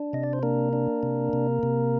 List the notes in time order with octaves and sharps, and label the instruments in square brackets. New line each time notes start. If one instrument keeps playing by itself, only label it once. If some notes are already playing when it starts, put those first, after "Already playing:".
Already playing: [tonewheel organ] D4
C3 D#5
D5
C5
A#3 D4 A#4
D4
C3
C3
C3